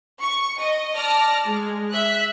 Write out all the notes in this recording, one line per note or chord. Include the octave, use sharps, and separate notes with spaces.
C#6
D#5
D5 A5 F6 A#6
G#3
E5 F#6